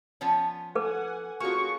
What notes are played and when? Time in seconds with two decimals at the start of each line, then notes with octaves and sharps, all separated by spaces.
0.21 F3 B3 C#4
0.75 A4 B4 F#5 G#5 D6
1.40 A#3 C#4 F4 F#4 G#4 C#6